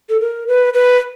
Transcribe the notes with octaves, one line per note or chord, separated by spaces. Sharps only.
A4
A#4
B4
B4